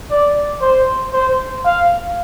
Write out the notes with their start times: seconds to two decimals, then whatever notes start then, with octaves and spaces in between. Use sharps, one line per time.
0.11 D5
0.62 C5
1.13 C5
1.65 F5